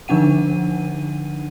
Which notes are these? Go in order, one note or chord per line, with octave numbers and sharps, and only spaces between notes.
D3 F3 D4 D#4 F#5 D#7